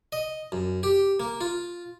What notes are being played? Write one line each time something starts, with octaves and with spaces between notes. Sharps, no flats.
D#5
F#2
G4
A#3
F4